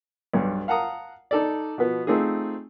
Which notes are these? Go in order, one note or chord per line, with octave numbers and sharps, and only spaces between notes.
B1 G2
F5 F#5 A5 A#5 D#6
D#4 A4 D5
B2 F3 B3
A3 C4 D#4 F4 G#4